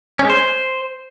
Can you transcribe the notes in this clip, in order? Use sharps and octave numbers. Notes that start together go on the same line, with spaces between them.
C#4
G#3
C5